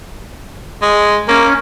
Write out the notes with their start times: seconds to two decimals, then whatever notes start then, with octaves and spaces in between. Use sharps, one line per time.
0.82 G#3
1.28 A#3 C#4